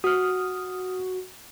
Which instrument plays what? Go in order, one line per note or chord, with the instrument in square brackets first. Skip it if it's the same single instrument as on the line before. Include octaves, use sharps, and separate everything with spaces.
[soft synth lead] F#4 [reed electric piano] D#6 F6